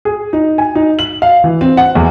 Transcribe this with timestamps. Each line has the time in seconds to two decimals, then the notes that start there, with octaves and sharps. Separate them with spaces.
0.05 G#4
0.33 D#4
0.58 G#5
0.75 D#4
0.99 F#7
1.22 F5
1.44 E3
1.61 C4
1.77 F#5
1.95 E2